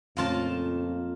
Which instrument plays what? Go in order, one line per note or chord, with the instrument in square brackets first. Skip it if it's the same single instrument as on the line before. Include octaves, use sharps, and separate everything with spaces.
[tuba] F2 [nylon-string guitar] A#2 C#3 A3 [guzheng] A#3 F4 A5